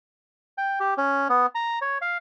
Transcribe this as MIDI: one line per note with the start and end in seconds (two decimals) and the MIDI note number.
0.58 0.79 79
0.80 0.94 67
0.98 1.28 61
1.29 1.46 59
1.55 1.79 82
1.81 1.98 73
2.02 2.18 77